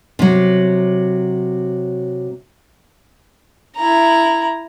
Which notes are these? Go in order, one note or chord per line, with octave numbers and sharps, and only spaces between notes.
C3 F#3
E4 A#5